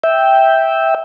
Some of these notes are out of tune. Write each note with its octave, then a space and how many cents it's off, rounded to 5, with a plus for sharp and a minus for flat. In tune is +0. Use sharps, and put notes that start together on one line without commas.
E5 -10 G5 +0